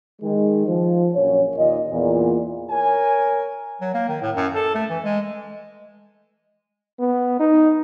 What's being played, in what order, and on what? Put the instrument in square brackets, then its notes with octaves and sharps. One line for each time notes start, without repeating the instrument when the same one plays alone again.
[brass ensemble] D#3 G#3
F3
A#1 F#2 C#5
D#2 A#2 D#5
E2 A#2
A#4 C#5 G#5
[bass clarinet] F#3
A#3
D#3
A2
F#2
A4
A3
E3
G#3
[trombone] B3
D#4